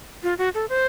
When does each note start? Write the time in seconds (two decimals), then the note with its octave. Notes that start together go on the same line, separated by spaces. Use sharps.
0.23 F4
0.38 F#4
0.55 A4
0.69 C5